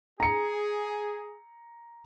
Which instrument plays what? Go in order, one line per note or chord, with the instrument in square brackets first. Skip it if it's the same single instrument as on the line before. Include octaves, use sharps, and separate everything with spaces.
[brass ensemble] G#4 [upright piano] A#5 C#7